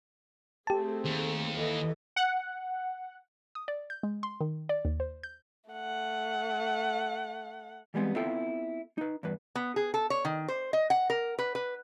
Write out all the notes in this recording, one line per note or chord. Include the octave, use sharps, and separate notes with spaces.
A3 C4 G4 G#4 A5
D#2
E3 A4 D#5
F#5
D#6
D5
G6
G#3
C6
D#3
D5
D#2
C5
G6
A3 F#5
E3 G3 G#3 B3 C4
B3 C4 E4 F4 A4 G5
D#4 B4
E2 G2 B4
B3
G#4
A4
C#5
D#3
C5
D#5
F#5
A#4
B4
B4